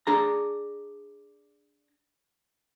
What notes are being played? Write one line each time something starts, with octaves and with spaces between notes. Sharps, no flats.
D4 G#4 A#5